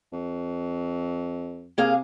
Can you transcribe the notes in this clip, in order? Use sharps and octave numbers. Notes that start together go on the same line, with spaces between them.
F2
C3 A#3 G#4 F5